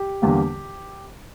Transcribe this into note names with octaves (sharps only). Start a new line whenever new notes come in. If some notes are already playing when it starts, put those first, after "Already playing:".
Already playing: G4
E2 D3 G3 A#3